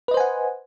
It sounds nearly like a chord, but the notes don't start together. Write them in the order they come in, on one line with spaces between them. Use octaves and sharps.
B4 D#5 C5 G#5 F#5